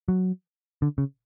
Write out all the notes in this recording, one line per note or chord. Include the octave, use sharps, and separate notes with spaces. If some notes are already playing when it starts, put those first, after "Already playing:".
F#3
D3
C#3